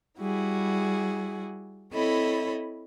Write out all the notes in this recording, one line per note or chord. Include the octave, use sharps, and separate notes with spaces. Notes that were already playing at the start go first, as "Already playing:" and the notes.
G3 E4 F#4 G#4
C4 E4 A4 C#5 D#5 B5